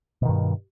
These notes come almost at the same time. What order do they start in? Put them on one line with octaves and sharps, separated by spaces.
B2 D#3 G2